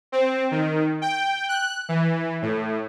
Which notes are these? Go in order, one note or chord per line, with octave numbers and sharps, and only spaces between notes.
C4
D#3
G5
F#6
E3
A2